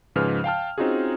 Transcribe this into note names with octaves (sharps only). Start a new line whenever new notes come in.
G#2 C#3 F3 B4 F6
F5 G5 A5 F6
C4 C#4 D#4 F4 F#4 G#4